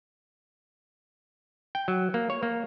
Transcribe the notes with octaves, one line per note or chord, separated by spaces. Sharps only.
G5
F#3
A#3
C#5
A#3